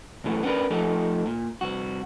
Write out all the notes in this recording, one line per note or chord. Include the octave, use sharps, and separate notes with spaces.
B1 E2 E3 A3 B3
B3 C#4 D4 A#4 B4
F3 A3 D#4 A4
A#2
C2 F#4